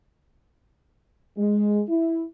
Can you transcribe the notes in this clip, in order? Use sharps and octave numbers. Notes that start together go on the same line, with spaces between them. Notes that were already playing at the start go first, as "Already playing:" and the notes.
G#3
E4